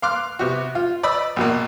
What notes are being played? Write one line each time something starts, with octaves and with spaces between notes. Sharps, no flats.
F5 C6 D6 F6 F#6
C3 B3 F#4
F4
D5 D#5 B5 D#6 E6
A#1 B2 A#3